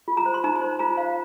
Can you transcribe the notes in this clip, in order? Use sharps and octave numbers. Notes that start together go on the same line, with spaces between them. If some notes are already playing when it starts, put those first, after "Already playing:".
F4
A#5
C5
C6
D#4 A#5
A#5
C5
F4 A#5
C5 F5